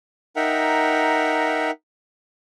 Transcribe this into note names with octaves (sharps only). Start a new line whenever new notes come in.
D#4 A#4 E5 F#5 G5 A#5